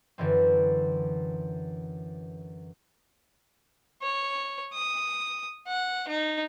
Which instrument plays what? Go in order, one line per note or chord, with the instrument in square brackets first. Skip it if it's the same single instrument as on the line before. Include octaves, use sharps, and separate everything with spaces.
[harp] F#2 D3 E3 C4
[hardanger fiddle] C#5
D#6
F#5
D#4